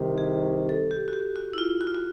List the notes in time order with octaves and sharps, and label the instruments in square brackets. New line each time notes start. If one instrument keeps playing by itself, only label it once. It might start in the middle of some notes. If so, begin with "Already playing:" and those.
Already playing: [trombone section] C2 C3 D#3
[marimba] G#4
A4
G4
F#4
G4
F#4
E4
F4
F#4
F4
F#4